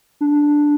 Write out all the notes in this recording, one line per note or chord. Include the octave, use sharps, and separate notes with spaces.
D4